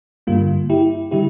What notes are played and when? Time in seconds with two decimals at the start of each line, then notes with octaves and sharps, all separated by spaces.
0.27 G2 D3 G3 A#3 F4
0.70 E4 G4
1.11 D3 G3 E4 G4